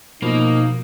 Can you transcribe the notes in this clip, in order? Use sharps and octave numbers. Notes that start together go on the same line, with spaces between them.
B2 F3 A#3 D#4